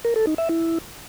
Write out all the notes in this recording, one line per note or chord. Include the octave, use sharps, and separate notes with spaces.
A#4
A4
D#4
E5
E4